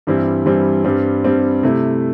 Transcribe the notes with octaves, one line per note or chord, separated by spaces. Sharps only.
G2 E3 G3 C4 E4
G2 E3 G3 C4 E4
G2 G3 C4
G2 G3 C4
C3 A3 E4